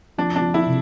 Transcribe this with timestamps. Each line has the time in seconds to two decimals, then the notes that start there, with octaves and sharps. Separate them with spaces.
0.18 F3 D4
0.36 D4
0.42 F3
0.54 E4
0.66 C3